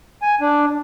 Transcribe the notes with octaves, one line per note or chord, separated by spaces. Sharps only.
G#5
D4